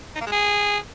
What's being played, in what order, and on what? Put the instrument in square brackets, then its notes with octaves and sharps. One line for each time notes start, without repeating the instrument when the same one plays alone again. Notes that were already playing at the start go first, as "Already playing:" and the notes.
[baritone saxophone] D#4
A#3
G#3
G#4